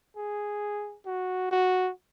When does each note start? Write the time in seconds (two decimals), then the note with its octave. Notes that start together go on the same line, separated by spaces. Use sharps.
0.16 G#4
1.06 F#4
1.51 F#4